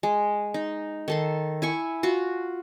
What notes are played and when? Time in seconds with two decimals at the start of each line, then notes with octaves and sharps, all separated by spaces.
0.03 G#3
0.54 D#4
1.08 D#3 A4 C6
1.62 E4 G#5 C#6
2.03 F4 F#4